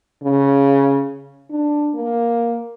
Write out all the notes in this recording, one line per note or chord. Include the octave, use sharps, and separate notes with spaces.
C#3
D4
A#3